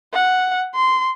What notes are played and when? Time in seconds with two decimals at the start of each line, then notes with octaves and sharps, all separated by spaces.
0.13 F#5
0.75 C6